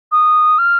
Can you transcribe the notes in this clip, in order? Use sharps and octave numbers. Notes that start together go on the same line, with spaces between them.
D#6
F6